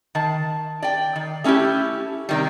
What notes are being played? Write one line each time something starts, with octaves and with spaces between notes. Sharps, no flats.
D#3 A5
D5 G5
D#3
A3 C#4 D#4 E4 G4
C3 D#3 G3